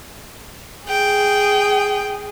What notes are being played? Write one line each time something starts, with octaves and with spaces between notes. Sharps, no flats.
G#4 G5